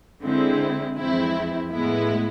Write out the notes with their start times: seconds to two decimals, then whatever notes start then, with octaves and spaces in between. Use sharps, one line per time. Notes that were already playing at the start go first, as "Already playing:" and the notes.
0.22 D3 G#3 C4 E4
0.97 F2 E3 G#3 C4 E4
1.72 A2 G#3 B3 E4